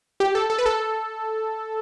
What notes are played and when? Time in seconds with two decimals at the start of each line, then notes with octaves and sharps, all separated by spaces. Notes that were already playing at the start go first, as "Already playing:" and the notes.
0.20 G4
0.35 A4
0.50 A4
0.59 B4
0.66 A4